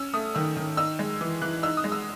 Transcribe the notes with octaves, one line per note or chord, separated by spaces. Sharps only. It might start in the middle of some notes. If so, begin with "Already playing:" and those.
Already playing: C#4 E6
A3 D#6
D#3 E6
D#3
D#4 E6
G#3
E3
E3 F#6
D#4 E6
D#6
G#3
E6